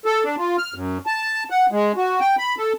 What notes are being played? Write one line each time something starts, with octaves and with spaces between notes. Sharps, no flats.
A4
D4
F4
F6
F#2
A5
F#5
G#3
F#4
G5
B5
A4